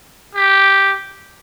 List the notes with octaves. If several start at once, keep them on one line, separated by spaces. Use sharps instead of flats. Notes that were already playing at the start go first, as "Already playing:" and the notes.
G4